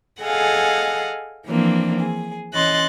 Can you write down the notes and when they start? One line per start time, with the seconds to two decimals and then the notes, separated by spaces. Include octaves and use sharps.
0.22 G#4 A4 D#5 F5 F#5 G#5
1.47 E3 F3 A#3 C4 D4
2.00 G#4
2.54 E3 C#4 D#5 C6 F#6 A6